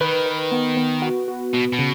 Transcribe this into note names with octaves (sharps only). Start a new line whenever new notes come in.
D#3 B4
B4
B3
B3
F#4
F#4
B2 B3
B2
C#3